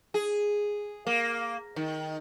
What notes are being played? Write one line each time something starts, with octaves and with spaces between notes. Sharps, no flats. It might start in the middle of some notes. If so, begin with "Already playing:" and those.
G#4
A#3
D#3